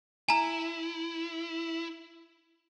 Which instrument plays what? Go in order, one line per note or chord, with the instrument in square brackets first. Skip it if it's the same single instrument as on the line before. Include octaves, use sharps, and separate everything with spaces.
[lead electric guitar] E4 [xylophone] G#5 A#5